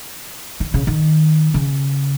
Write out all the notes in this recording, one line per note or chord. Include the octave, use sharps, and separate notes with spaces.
D#3
C#3
D#3
C#3